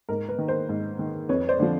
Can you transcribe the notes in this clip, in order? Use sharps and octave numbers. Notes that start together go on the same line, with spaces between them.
G#2 A#4
B4
D#3
A#4 C5
G#2
D#3
F2 B4 C#5
C5 D5
D3 F3